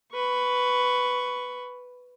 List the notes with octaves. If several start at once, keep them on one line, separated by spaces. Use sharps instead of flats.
B4 C#6